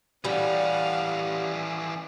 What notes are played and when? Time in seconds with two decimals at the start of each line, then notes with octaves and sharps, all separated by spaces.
0.25 E3 G3 C#4 F5 F#5